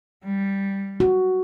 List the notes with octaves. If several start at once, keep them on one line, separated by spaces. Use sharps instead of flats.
G3
F#4